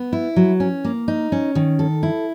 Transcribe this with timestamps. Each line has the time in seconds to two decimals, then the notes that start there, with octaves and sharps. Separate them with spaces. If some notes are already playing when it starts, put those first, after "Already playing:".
Already playing: B3
0.13 E4
0.36 F#3
0.60 C#4
0.84 A#3
1.08 D#4
1.32 C#4
1.55 D#3
1.79 A4
2.03 E4